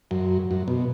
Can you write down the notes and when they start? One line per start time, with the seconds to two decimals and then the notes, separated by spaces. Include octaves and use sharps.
0.11 F#2
0.51 F#2
0.68 B2